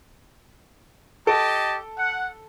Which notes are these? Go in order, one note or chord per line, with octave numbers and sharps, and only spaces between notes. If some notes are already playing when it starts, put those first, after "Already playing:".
G4 A4 D#5 A5 D7
F#5